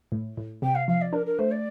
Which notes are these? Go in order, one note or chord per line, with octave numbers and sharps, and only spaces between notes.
A2
A2
C3 G5
F5
F3 F5
D5
D4 A#4
A#4
A3 C5
D5